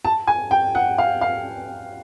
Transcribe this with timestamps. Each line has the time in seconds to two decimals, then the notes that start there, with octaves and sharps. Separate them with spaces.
0.05 A5
0.27 G#5
0.51 G5
0.75 F#5
0.98 F5
1.21 F5